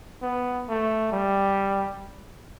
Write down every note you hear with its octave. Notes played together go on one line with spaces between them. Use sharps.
B3
A3
G3